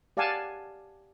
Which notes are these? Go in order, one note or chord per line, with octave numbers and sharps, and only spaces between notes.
G4 D5 F5 F#5 G#5 A5